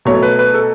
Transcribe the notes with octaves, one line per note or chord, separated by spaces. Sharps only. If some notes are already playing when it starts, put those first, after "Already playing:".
B2 F#3 A3 C#5
B4
B4
A4